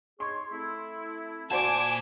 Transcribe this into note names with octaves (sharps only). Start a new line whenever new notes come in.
D#4 G#4 C#5 C6
A3 C4 E4
A#2 F#4 C5 D5 G#5 A5 D6 G#6